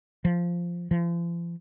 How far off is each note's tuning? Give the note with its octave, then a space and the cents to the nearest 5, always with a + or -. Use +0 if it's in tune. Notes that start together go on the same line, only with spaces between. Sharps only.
F3 -5
F3 -40